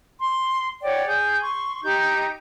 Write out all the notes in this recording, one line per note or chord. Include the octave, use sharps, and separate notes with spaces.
C6
C#5 D5 F#5 G5
G#4 G6
C6 C#6
D#4 G4 A#5 G6